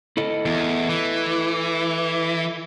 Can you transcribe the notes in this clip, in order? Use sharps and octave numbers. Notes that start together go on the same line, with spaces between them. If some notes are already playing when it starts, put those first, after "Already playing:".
E4 A4 D#5
E2
E3